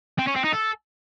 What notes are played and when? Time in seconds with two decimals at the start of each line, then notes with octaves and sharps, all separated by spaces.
0.19 C4
0.27 C#4
0.36 C4
0.44 D#4
0.53 A4